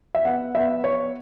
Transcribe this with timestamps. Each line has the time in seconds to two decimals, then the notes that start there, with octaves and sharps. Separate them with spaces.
0.15 E5
0.25 B3 F#5
0.55 B3 E5
0.84 B3 C#5